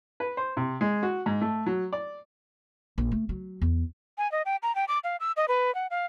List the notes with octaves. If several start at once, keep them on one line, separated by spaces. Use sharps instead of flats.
B4
C5
C3
G#3
F#4
G#2
A3
F#3
D5
A#1
A3
F#3
E2
G#5
D#5
G5
A#5
G5
D6
F5
E6
D#5
B4
F#5
F5